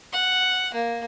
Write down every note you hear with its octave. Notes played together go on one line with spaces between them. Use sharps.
F#5
A#3